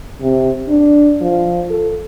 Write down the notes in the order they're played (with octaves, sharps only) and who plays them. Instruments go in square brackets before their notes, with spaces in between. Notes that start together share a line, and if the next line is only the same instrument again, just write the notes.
[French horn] C3
D4
F3
A4